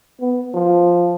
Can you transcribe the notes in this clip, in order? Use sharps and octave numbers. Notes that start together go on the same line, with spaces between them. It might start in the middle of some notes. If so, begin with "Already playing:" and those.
B3
F3